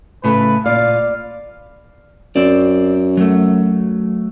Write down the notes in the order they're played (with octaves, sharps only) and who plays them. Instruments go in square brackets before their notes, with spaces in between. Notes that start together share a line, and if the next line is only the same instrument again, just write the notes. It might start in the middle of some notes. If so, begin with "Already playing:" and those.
[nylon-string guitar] A2 C#3 A3 [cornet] B4
[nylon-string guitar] A#2 [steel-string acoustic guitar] D5 [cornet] F5
[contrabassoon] F#2 [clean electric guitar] C4 D5
[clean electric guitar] F#3 A3